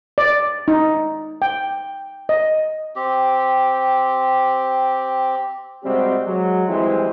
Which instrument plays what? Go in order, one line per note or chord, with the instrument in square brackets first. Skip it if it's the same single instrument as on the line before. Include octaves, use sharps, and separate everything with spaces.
[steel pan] D5
D#4
G5
D#5
[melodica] C4 G4
[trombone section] C3 G3 G#3 C4 F#4 G4
F#3 G#3
E3 F3 G3 G#3 C4 E4